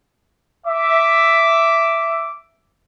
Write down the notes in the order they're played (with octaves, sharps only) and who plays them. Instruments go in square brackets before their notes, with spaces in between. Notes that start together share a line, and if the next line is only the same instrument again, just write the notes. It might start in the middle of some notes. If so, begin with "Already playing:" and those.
[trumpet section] E5 D6